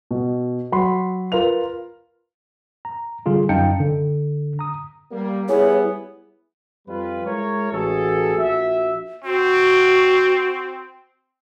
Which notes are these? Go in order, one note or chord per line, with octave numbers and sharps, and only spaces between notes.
B2
F#3 B5 C6
F4 A#4 B4 F5 F7
A#5
D3 G3 F4 G#4
F#2 D#4 F5 G5 A5 C#7
D3
A#5 D#6
G3 A#3
G3 B3 E4 G#4 C#5 G#5
F2 G3 F4 B4
G#3 E4 A#4 C#5
A1 F#4 G#4 A4
A#1 F#4 E5
C4 F#4